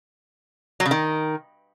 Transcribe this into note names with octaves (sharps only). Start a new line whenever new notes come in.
F#3
C#3
D#3